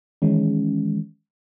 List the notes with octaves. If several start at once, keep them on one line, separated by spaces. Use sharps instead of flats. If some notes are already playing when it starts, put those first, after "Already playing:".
D#3 E3 G#3 C#4